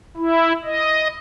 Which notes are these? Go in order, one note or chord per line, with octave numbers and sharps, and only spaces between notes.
E4
D#5